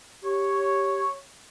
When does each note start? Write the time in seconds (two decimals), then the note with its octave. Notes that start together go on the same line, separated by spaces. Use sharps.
0.23 G4 C#5